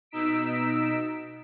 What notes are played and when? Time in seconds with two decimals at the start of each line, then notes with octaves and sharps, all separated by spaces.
0.11 B2 D#4 E6 B6 D7